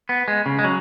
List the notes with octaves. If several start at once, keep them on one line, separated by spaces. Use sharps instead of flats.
B3
G#3
C#3
G#3
F#3